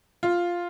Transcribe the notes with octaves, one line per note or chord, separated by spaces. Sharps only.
F4